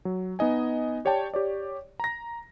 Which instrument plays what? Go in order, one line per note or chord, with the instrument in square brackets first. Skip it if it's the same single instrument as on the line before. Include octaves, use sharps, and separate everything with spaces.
[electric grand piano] F#3
B3 D#4 D#5 G#5
G4 C#5 D5 G5 A5
G4 C#5 D5
A#5 A#6